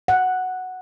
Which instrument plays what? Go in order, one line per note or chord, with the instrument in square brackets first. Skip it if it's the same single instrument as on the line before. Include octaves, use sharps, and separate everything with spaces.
[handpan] F#5